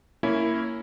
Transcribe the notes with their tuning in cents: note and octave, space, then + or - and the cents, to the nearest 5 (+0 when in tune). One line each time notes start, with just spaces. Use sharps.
A#3 -10 C#4 +10 E4 +0